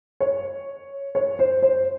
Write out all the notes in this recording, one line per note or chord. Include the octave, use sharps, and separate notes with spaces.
C#5
C#5
C5
C5